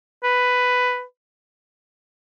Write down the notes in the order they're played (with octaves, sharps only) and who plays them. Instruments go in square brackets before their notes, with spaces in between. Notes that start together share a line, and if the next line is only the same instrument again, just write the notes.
[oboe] B4